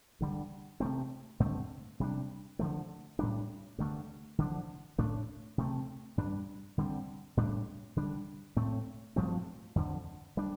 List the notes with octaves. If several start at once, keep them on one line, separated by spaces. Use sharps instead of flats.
G2 D3 G3
C3 A3 C4
G2 D3 A3 C4
C3 G3 D4
D3 F3 A3
A2 G3 D4
G2 D3 A3
D3 F3 D4
A2 A3 D4
C3 A3 C4
G2 G3 D4
D3 G3 C4
A2 G3 D4
D3 G3 D4
A2 A3 C4
G2 F3 A3 C4
F2 D3 F3
G3 D4